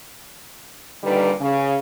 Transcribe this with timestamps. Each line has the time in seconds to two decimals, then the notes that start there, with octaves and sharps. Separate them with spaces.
1.03 G2 A#2 D3 D#3 G3 B4
1.40 C#3